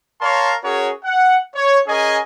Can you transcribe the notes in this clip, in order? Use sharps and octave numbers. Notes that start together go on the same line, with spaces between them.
A#4 C#5 F5 A5 A#5 C6
C#4 F#4 G#4 A#4 C#5
F#5
C#5
C#4 G#4 A#4 D#5 G#5